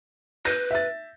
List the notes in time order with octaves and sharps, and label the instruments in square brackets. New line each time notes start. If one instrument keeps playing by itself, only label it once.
[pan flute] B4 [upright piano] G6 A#6
[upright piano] E5 A6